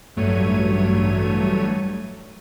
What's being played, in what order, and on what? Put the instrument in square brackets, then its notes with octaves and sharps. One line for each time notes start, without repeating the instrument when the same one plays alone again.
[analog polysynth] A1 G2 F#3 A3 C#5 D#7